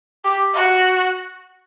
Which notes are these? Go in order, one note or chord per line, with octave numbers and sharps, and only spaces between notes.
G4
F#4